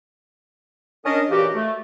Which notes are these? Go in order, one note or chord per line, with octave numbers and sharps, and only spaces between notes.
C#4 D4 A#4 D#5
A#2 C#3 E3 F#4 G4
A3